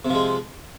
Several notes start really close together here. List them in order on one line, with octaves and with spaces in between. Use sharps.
C3 F3 G#3